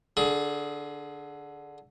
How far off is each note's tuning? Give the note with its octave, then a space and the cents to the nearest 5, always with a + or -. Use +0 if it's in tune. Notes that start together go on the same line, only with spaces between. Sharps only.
D3 +0 G#4 +20